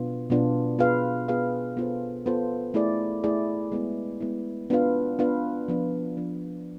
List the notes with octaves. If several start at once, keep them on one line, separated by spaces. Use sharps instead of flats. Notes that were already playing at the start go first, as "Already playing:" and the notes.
Already playing: B2 B3 D4 F4
B2 B3 D4 F4
B3 F4 G#4 B4 F5
B3 F4 G#4 B4 F5
B3 F4 A4 C5
B3 F4 A4 C5
A3 E4 G#4 D5
A3 E4 G#4 D5
G#3 B3 E4
G#3 B3 E4
B3 D4 F4 B4 F5
B3 D4 F4 B4 F5
F3 B3 D4
F3 B3 D4